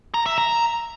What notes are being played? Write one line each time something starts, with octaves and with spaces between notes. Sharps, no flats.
A#5
E5
A#5